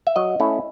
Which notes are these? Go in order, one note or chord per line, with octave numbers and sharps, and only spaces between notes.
E5
F#3 D#5
A3 C#4 E4